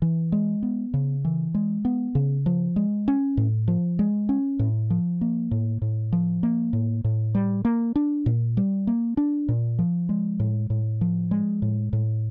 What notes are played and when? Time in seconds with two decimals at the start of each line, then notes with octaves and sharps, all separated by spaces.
0.02 E3
0.32 G#3
0.63 B3
0.94 C#3
1.25 E3
1.54 G#3
1.85 B3
2.15 C#3
2.46 F3
2.76 G#3
3.08 C#4
3.37 A2
3.68 F3
3.99 G#3
4.29 C#4
4.59 A2
4.90 F3
5.21 A#3
5.51 A2
5.82 A2
6.13 F3
6.43 A#3
6.73 A2
7.04 A2
7.35 G3
7.65 A#3
7.96 D4
8.26 A#2
8.57 G3
8.87 A#3
9.17 D4
9.49 A#2
9.79 F3
10.09 G#3
10.40 A2
10.70 A2
11.01 F3
11.31 G#3
11.62 A2
11.93 A2